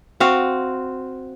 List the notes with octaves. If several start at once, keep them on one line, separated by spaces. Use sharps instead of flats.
C4 F#4 F5